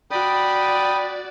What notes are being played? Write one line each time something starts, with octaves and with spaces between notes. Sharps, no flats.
F#4 D5 G5 B5 D#6